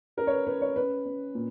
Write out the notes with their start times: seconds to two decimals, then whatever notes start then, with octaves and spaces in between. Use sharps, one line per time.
0.17 C#4 A#4
0.27 C#5
0.32 B4
0.47 C#4 B4
0.62 C#5
0.76 C#4 B4
1.06 C#4
1.35 A#2